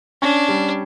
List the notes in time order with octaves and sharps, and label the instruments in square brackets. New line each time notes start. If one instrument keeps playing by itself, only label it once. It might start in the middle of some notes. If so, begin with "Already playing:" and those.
[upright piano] C#4 [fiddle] D4
[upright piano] G3